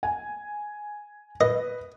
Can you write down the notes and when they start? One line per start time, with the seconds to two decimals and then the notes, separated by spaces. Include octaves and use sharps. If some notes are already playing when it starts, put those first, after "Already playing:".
0.03 G#5
1.41 B4 D#5